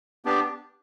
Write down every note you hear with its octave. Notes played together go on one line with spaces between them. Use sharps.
B3 D4 G4